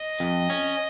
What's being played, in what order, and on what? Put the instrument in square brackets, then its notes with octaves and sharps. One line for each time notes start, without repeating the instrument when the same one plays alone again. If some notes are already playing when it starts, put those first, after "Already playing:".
Already playing: [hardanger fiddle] D#5
[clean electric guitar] F2
C#4